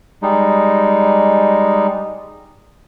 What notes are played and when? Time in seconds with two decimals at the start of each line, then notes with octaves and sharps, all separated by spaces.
0.22 G3 G#3 D#4